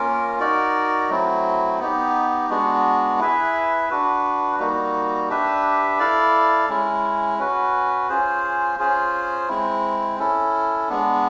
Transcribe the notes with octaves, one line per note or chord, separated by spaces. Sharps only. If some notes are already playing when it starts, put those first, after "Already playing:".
Already playing: A#3 C#4 F4 A#4
D#4 F#4 A#4 D5
F#3 A3 C4 E4
B3 D#4 G4
G#3 B3 D4 F#4
E4 G#4 B4 E5
D4 F#4 B4
G3 A#3 D#4 F#4
D4 G4 B4 E5
E4 A4 D5 F5
G#3 C#4 E4
C#4 F#4 B4
C#4 F4 G#4 C5
C#4 F4 G#4 C5
G#3 C4 E4
C#4 E4 A4
G#3 B3 D4